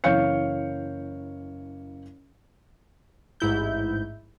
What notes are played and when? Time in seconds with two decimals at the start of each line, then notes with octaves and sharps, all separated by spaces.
0.04 F#1 E3 C#5 F5 G6 C#7
3.40 A1 G#2 E4 G6